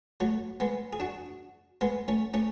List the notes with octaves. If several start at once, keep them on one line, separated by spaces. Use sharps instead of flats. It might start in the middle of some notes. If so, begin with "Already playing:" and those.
F#3 A3
G#3 B3
G#4
D4 F#4
G#3 B3
A3 C#4
A3 C#4